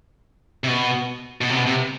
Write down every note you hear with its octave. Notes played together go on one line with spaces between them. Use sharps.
C3
B2
B2
C3
B2
C3